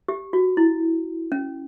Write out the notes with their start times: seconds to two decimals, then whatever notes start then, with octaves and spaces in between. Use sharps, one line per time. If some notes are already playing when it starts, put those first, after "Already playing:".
0.08 G4
0.33 F#4
0.57 E4
1.32 C#4